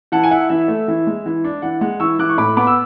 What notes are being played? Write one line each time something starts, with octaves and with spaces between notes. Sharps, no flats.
E3 F#5 A5
G#5
E4 F#5
E3 E5
A3
E3
G#3
E3
D4
E3 F#5
G#3 F#5
E3 C#6 E6
E3 D6 F#6
C#6
A2 B5 D6
B3 B5 D6
E6